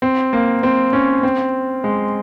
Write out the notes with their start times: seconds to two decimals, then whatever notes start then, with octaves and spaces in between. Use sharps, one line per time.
0.02 C4
0.33 A#3
0.63 C4
0.93 C#4
1.23 C4
1.84 G#3